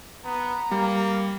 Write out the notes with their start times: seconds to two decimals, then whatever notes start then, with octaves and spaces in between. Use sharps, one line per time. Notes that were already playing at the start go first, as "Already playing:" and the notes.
0.25 B3 A#5
0.71 G3 A#3